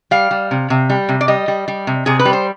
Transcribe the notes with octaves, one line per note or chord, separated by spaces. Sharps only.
G3 F5
G3
C3
C3
G3
C3
D5
G3 D#5
G3
G3
C3
C3 G#4
B4
G3
C5